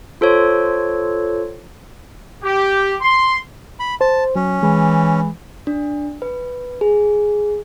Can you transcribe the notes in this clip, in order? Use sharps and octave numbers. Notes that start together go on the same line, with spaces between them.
F4 A4 C5 C#5
G4
C6
B5
C5 A5
F#3 C#4
E3 G#3
D4
B4
G#4